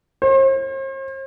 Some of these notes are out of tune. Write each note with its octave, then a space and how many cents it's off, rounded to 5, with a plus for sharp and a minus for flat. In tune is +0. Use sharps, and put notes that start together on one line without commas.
C5 +45